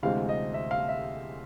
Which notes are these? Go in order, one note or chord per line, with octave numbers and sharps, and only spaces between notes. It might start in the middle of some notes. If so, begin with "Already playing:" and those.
D2 C3 E3 G#3 C4 F5
D#5
E5
F5
E5